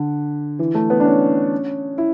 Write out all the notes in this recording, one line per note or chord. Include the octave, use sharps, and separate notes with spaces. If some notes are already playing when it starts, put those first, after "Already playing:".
Already playing: D3
E3
A3
B3
D4
C#4
E4